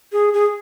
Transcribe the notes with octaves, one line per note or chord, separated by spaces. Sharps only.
G#4
G#4